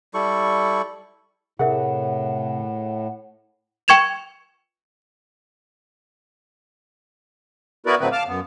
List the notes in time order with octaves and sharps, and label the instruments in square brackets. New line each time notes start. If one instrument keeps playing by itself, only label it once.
[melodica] G3 E4 A4 C#6
[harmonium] A2 [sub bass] C3 [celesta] G#4 A#4 E5 [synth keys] F#5
[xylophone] G5 C#6 G#6 E7 F7
[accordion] B3 E4 F#4 A#4 B4 D5
A2 D3 F#3 A3 C4 B4
F5 A5 D6 F6
F#2 B3